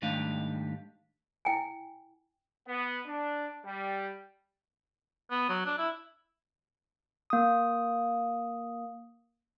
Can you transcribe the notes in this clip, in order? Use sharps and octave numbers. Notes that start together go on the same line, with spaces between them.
G#2 D#3 G3 A3 D4 F5
E4 G5 G#5
B3
D4
G3
B3
F#3
D4
E4
A#3 D#6